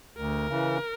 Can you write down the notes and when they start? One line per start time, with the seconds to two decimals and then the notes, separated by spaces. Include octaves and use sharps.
0.17 D2 A#4
0.48 C#3 E3